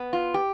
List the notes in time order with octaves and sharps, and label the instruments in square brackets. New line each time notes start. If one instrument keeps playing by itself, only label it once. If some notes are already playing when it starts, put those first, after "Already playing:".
Already playing: [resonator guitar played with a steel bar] B3
F4
G4